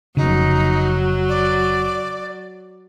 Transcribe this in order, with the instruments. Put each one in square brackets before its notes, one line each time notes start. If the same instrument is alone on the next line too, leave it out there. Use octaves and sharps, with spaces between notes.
[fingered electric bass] F1 C#3 [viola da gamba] F#3 [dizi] D#4
[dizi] D5